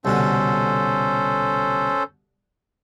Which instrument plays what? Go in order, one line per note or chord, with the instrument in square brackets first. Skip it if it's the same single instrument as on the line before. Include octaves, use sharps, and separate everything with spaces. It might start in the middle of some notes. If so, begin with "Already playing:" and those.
[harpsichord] C2 B2 D3 [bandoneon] C#4 A4 C5